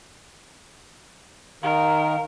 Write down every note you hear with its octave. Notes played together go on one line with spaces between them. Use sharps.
D#3 A#4 F5